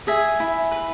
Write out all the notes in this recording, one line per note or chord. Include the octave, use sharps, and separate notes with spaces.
G#4 E5 G#5
E4
B4